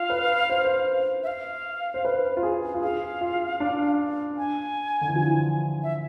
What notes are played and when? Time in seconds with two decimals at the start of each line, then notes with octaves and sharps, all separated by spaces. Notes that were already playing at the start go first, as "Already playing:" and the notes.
Already playing: F4 F5
0.10 B4
0.50 C5
0.65 C5
1.23 E5
1.27 F5
1.94 C5
2.05 B4
2.37 F4
2.43 G#4
2.74 F4
2.82 G#4 F5
3.21 F4
3.60 D4
4.37 G#5
5.01 D3
5.08 E3
5.16 F3
5.83 E5